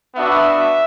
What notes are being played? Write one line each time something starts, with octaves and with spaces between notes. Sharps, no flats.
B3 D4 F#4 E5